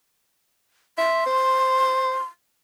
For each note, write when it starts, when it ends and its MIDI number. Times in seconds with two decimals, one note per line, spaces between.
0.98 1.22 76
0.98 2.24 84
1.26 2.18 72